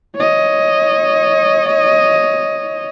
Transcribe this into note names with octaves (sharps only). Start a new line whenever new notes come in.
C#5 D#5